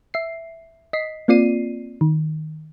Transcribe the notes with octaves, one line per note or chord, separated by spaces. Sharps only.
E5 C7
D#5 B6 C7
A#3 C4 F4 D5 C7 D#7
D#3